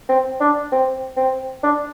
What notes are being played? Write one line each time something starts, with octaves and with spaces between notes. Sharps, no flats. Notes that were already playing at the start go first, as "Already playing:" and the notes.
C4
D4
C4
C4
D4